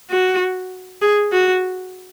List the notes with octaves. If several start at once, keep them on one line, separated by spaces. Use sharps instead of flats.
F#4
G#4
F#4